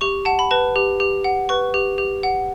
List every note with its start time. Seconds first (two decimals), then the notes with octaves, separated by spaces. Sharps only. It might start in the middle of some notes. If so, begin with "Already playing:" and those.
0.01 G4 C#6
0.25 F#5 A5
0.39 B5
0.51 B4 A5
0.76 G4
1.00 G4
1.24 F#5
1.49 B4 C#6
1.74 G4
1.98 G4
2.23 F#5